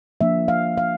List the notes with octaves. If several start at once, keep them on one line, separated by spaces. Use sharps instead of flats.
F3 A#3 D4 E5
F5
F5